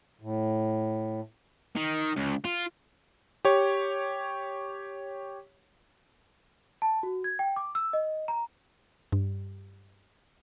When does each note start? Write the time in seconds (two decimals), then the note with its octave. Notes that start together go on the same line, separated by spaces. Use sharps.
0.21 A2
1.76 D#3
2.16 C#2
2.45 F4
3.45 G4 C#5
6.82 A5
7.03 F#4
7.24 G#6
7.39 G5
7.56 D6
7.75 E6
7.93 D#5
8.28 A#5
9.12 G2